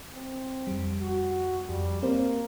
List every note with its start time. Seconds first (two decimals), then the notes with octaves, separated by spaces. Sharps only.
0.15 C4
0.67 F2 G3
1.02 F#4
1.69 F2 G3
2.03 A#3 C4 A#4 C5